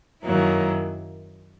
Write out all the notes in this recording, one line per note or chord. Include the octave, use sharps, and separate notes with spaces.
F#2 D#3 F#3 A#3 E4